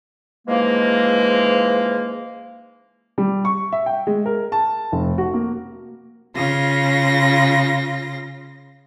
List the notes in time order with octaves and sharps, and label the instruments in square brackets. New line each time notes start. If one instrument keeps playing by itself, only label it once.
[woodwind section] G#2 C#3 E3 F3 G#3 A#3
[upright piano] G3
C#6
E5
G5
G#3
A#4
A5
F1
F#4
A#3
[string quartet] C#3 F4 A#6